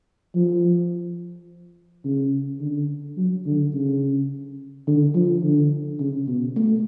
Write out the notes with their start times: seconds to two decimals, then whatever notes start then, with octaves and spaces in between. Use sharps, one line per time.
0.35 F3
2.05 C#3
2.61 D3
3.17 F#3
3.46 D3
3.74 C#3
4.88 D3
5.15 F3
5.43 D3
6.00 C#3
6.28 B2
6.56 A3